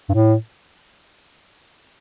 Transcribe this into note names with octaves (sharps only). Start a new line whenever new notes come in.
G2
A2